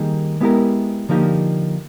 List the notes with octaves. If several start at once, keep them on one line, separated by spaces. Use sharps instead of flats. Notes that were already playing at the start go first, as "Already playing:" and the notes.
Already playing: D#3 G3 A#3 D#4 G#4
G#3 B3 E4 G4 A#4
D3 F3 A#3 D#4 G4